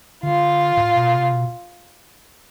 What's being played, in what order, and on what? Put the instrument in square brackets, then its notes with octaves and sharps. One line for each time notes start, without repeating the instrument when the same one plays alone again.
[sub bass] D3 [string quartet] F4
[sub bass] A2
B2
C3
B2